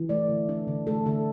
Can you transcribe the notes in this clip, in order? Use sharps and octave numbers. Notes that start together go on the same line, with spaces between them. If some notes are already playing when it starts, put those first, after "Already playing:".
Already playing: E3
A3 D5
D3
D4
D3
A3 A4
D3 A4